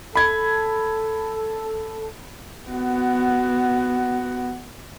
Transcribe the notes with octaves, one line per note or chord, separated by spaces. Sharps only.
A4 B5 G#6
B3 F#4